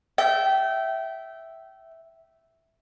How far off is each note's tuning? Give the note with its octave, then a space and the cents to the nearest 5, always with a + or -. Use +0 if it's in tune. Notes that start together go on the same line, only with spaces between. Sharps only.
E5 +0 G5 -25